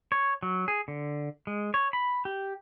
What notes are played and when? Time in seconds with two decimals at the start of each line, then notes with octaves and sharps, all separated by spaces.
0.12 C#5
0.43 F#3
0.68 G#4
0.88 D3
1.47 G#3
1.74 C#5
1.93 B5
2.25 G4